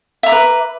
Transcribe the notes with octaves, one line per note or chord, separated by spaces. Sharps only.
B4 E5 A#5 D6